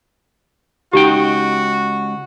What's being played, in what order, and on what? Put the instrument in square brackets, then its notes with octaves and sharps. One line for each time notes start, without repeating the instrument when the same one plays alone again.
[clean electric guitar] C#2 D#4 G5 [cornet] F#4 [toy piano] G4